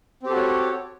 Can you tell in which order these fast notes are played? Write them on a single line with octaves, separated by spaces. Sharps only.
C4 G4 A4 F#4 C#5